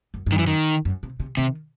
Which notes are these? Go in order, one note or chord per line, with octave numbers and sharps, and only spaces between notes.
F#2
G2
D#3
F#2 E3
D#3
F#2
C3
C3
C3 D#3